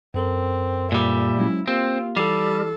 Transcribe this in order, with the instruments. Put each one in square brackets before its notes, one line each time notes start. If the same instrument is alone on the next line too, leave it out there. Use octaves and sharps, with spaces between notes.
[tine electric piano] F#2 A4 A#4 [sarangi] C4
[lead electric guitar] A#2 G3 [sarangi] E5
[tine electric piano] F#3 G#3 C#4 [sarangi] E4
[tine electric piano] A#3 G4 [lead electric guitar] C4 [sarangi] F4
[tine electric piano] E3 E4 C7 [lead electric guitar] G3 [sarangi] A4